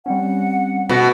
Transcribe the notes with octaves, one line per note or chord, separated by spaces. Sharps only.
G3 C4 C#4 F#5
B2 A3 F#4